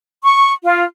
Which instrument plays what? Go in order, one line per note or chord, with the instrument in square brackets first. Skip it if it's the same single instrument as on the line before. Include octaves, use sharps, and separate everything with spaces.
[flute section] C#6
F4